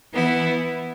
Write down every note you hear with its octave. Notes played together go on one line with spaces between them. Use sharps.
E3 B3 E4